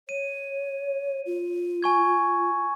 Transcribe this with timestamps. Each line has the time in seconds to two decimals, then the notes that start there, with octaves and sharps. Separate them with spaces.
0.09 C#5 D#7
1.26 F4
1.83 G#5 C#6 G#6